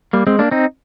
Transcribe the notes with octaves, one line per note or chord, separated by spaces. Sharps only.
G3 A#3
G#3 C4
A#3 D4
C4 D#4